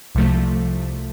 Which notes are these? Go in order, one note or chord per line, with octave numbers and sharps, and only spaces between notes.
C2 C3 F3 A3